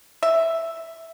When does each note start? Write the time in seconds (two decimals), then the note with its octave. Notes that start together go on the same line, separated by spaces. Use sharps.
0.23 E5